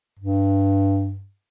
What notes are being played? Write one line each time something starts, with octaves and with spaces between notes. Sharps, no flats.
G2